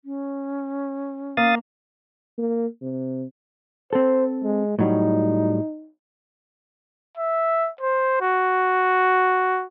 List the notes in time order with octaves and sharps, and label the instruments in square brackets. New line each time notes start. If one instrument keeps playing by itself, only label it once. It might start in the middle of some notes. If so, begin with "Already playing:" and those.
[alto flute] C#4
[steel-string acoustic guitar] A#3 [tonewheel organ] F5 D#6 A6
[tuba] A#3
C3
[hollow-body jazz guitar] C4 A4 [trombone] C5
[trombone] G#3
[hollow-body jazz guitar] A2 F#3 G3 [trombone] D#4
[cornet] E5
C5
F#4